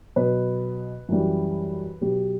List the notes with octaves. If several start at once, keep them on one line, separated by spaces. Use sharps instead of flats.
B2 F#3 B4
F#2 E3 G3
B2 F#3 G4